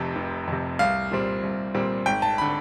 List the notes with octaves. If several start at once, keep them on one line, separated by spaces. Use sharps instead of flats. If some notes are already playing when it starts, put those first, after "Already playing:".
Already playing: F1 F2 C3
F1
F2 C3
C2 F5
A#2 G3 C4
C2
A#2 G3 C4
G#1 G5
A5
B5
D3